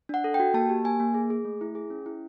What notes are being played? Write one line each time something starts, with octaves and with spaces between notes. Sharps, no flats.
D4 F#5
A4
G5
F#4
A#3 A5
G4
A#3 G#5
A#3
G#4
G#4
A3
E4
G#4
C#4
E4